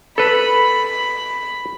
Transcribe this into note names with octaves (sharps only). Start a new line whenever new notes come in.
A4 B4 B5